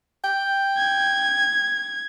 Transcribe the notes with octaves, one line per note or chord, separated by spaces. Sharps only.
G5
G#6